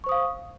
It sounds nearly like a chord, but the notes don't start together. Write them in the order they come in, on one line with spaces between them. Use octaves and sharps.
C#6 C5 D#6 F5